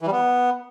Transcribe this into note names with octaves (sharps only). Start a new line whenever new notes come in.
E3
G3
B3